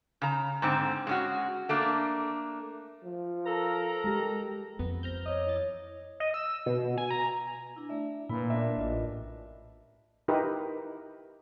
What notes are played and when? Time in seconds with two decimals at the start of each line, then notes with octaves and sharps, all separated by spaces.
0.22 C#3 A#5
0.62 G#2 D3 C4
1.07 G#3 C#4 F#4
1.69 A3 A#3 D4
3.04 F3
3.46 A4 A#4 A#5
4.04 G#3 G4
4.79 F2 B3
5.03 C5 A#5 F6 G6
5.26 C#5 D#5
5.47 E3 A6
6.20 D#5
6.34 E6
6.66 B2
6.98 G#5
7.10 A#5
7.76 D4 E4
7.89 A3 D5 E5
8.29 A#2 E4 B4 B5
8.50 A#3 D4 A#4 E5
8.78 A1 F4 D#5
10.28 D#4 E4 G4 A#4 B4